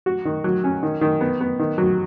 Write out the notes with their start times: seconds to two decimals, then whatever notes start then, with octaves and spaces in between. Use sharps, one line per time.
0.06 F#4
0.25 D#3
0.44 F#3
0.64 C#4
0.83 D#3
1.01 D#3
1.21 B3
1.41 B3
1.59 D#3
1.78 F#3